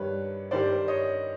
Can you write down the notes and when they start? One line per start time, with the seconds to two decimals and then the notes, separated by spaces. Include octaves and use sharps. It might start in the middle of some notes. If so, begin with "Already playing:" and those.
Already playing: G2 D#3 G3 B4 C#5
0.51 G2 D#3 G3 C5 D5
0.88 C#5 D#5